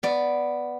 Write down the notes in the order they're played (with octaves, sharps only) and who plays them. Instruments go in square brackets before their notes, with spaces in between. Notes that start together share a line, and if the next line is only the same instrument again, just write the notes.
[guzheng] B3 D5